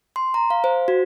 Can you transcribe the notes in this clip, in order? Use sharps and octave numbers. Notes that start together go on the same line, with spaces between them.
C6
A#5
F5
C5
F#4